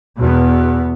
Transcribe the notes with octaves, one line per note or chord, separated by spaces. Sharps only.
E2 B2 B3